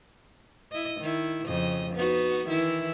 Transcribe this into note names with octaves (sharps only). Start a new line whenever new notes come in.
E4 D#5
D#3 E4
F2 C#3 D#5
B3 D#4 F#4
D#3 E3 E4